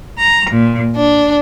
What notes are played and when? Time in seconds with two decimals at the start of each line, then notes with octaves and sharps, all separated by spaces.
0.18 A#5
0.50 A#2
0.96 D4